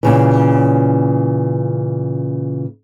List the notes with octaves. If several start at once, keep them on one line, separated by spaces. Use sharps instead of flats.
A#2 C#3 E3